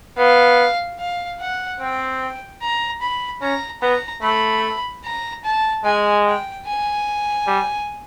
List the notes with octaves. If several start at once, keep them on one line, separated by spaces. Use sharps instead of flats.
B3 F5
F5
F#5
C4 G5
A#5
B5
C#4 A#5
B3 A#5
A3 B5
A#5
A5
G#3 G#5
G5
G#5
G3